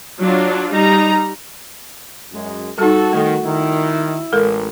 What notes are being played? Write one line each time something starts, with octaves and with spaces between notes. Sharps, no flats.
F#3 D4 F4
G3 D#4 A#5
F#2 G#3
G3 D#4 F#4 A4
D#3 A3 A4
D#3 E4
A1 G#3 A4 A#4